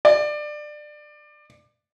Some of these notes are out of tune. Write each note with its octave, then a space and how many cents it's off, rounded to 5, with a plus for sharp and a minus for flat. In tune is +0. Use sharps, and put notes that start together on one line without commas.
D5 +20